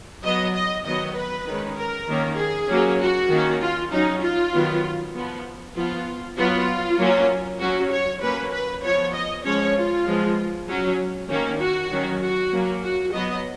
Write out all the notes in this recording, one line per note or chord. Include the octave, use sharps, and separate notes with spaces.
F#3 B3 D#5
D#5
D#3 F#3 B3 D#5
B4
D#3 G#3 C#4
A#4
D#3 A#3 C#4
G#4
F#3 A#3 C#4
F#4
D#3 A#3 C#4
F4
F#3 C#4 D#4
F4
D#3 F#3 B3
F3 B3
F3 B3 F4
F#3 B3 F4
F#3 A#3 C#4
F#3 C#4 F#4
C#5
F#3 A#3 C#4 B4
B4
F3 B3 C#5
D#5
F3 G#3 C#4 C#5
F4
F3 G#3 B3
F#3 C#4
D#3 A#3 C#4
F#4
D#3 F#3 C#4
F#4
F#3 A#3 C#4
F#4
F#3 B3 D#5